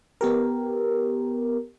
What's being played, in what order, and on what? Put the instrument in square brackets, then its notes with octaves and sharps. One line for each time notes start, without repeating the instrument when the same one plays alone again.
[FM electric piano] B3 G4 A#4